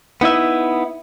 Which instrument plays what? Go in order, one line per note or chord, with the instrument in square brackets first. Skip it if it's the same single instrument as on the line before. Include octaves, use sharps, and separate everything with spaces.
[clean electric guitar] B3 D#4 E4 E5